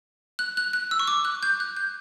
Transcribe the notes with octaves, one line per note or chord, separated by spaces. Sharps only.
F#6
F#6
F#6
E6
C#6
D6
F#6
G6
F#6
G6